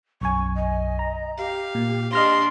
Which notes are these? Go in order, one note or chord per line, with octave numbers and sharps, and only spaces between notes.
B1 F#2 G#5 C#6
D#5
A#5
G4 F5
A#2
D4 G4 D#5 C6 F6 A#6